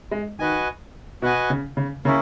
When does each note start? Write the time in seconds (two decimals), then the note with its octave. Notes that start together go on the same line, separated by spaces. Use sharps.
0.11 G#3
0.39 D#3 F#4 B4 D#5 G#5
1.22 B2 F#4 B4 D#5 G#5
1.50 C#3
1.77 C#3
2.05 C#3 A#3 C#4 E4